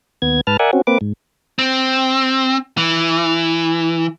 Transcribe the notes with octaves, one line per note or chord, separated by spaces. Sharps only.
D#2 B3 G#6
G#2 B4 A5 F6
A#4 D5 E5 F#5 G#5
C4 C#4 F#4
A#3 C4 B4 D6
G#2
C4
E3